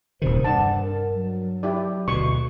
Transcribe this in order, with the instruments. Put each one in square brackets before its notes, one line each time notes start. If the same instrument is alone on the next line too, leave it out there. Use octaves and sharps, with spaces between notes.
[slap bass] D#1 C3 D#3 [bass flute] C5
[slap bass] G2 [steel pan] D4 A5 [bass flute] F#5
[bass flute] A#4
F#3
[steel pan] E4 G4 D5
[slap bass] D2 B2 [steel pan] C#6